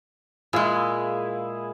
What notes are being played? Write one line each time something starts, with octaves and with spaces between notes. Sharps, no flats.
A#2 G#3 E4 G#4 F5